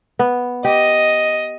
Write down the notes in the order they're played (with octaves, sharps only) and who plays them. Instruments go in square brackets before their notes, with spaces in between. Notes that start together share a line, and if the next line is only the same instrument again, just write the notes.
[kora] B3
[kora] G4 [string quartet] D#5